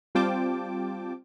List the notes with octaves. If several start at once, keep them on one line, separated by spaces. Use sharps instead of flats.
G3 C4 F4 G5 A5 D6